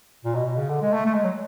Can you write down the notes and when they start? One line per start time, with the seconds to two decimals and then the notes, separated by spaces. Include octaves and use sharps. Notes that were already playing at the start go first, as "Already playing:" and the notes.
0.25 A#2
0.35 B2
0.46 B2
0.58 C#3
0.69 D3
0.82 G#3
0.93 A3
1.06 A3
1.14 G#3
1.23 F#3